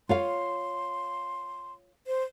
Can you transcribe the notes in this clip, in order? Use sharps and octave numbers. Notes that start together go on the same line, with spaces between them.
F4 C#5 F5 C6
C5